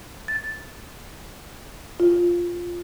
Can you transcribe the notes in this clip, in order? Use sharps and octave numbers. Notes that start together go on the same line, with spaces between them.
A6
F4